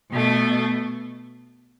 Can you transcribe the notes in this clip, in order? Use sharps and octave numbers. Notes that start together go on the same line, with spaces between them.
B2 A3